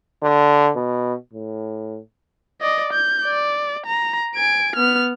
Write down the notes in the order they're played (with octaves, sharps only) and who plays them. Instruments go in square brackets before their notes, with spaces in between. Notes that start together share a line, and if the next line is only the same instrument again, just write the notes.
[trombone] D3
B2
A2
[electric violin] D5 D#5
G6
D5
A#5
G#5 D7
B3 F6